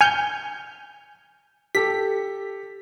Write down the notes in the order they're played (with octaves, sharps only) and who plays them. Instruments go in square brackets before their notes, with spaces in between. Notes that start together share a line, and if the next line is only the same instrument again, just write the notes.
[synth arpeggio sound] G#5 F6 G6 [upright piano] C#7 G7
[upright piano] G4 A4 [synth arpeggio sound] B6